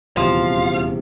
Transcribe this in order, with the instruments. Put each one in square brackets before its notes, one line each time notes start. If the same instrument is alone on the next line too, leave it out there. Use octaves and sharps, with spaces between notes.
[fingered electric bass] D#1 E2 C3 [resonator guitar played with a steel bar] F3 [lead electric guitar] F5